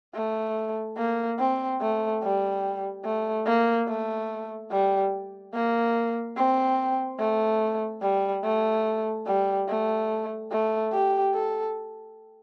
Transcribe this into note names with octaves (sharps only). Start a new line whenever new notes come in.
A3
A#3
C4
A3
G3
A3
A#3
A3
G3
A#3
C4
A3
G3
A3
G3
A3
A3
G4
A4